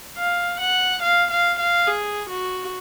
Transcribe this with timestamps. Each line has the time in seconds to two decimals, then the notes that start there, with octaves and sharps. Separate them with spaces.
0.18 F5
0.60 F#5
1.03 F5
1.31 F5
1.59 F5
1.87 G#4
2.30 F#4